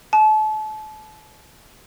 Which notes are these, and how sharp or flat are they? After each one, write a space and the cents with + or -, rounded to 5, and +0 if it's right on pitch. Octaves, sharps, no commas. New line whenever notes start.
A5 -35